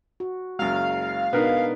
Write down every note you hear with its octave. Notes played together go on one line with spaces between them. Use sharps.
F#4
F#1 F#3 G#3 F5
B2 B3 D4 D#4 A#4